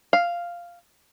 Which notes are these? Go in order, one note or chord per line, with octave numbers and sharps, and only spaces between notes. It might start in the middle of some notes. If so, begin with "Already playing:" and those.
F5